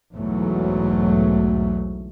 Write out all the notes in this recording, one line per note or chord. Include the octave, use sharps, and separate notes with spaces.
B1 E2 G#2 F#3 A3